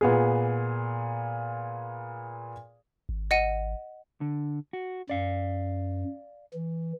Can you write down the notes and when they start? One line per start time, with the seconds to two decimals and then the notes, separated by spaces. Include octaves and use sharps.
0.01 A#2 B3 G#4
3.09 G#1
3.31 D#5 F#5 D#7
4.21 D3
4.73 F#4
5.10 F#2 D5 F5
6.54 E3